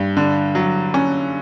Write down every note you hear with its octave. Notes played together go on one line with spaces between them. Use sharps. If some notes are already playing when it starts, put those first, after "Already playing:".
Already playing: G2
D3
F#3
C#4